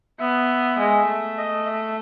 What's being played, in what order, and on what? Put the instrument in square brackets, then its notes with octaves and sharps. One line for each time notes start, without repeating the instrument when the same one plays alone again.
[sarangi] B3 [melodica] E5
[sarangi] G#3
A3
[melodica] D#5
E5